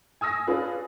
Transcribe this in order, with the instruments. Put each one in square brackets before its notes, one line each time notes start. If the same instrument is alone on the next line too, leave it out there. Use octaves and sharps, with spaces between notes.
[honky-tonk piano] G#5 D#6 E6 A#6
C#4 D4 F4 G#4 B4